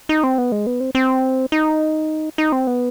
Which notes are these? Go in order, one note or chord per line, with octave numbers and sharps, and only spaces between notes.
D#4
C4
B3
G#3
B3
C4
C4
D#4
D#4
C4
B3